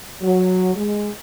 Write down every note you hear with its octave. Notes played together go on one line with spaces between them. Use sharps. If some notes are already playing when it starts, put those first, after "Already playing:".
F#3
G#3